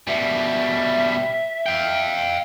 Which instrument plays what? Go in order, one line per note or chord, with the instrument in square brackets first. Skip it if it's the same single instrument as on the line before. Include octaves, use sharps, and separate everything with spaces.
[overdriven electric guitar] B2 G3 [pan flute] E5
[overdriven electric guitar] F5 G5